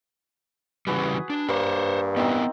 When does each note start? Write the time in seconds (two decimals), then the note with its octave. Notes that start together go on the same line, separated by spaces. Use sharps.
0.87 C#3 E3 G3 F#4 G#4 B4
1.30 D4
1.49 G2 A#3 C5 C#5
2.17 B3 C4 D#4 E4 A#4